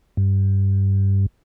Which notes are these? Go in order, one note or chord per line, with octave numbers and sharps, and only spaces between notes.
G2